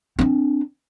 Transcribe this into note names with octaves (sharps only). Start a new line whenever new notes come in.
C4 D4